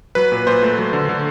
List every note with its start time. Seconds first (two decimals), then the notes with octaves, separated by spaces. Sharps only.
0.15 F#3 B4
0.32 A#2
0.47 A#2 C5
0.63 A3
0.78 F#3
0.93 D3
1.09 D3